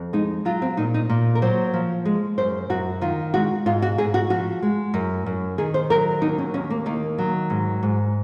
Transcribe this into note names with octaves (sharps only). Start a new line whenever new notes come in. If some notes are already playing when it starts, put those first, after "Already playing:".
Already playing: F2
G#3 D#4
F#3 F4
C4
A#2 D#4
D#4
A#2
A#4
F#3 C5
F3
G#3
F#2 C5
F#2 F#4
D#3 F4
G#3 F#4
G#2 F4
F#4
G#2 G#4
F#4
F3 F#4
G#3
F#2
F#2
D#3 G#4
C5
F#3 A#4
D#2 D#4
C#4
D#2 C#4
A#3
D#3 A#3
F#3
G#2
G#2